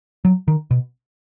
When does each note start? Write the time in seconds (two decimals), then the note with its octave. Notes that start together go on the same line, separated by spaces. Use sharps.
0.25 F#3
0.48 D#3
0.71 B2